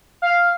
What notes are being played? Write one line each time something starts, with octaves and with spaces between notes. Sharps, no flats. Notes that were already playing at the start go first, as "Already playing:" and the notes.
F5